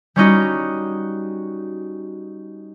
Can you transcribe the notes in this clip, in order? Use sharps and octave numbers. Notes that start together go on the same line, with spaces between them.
G3 C#4 D#4 F#4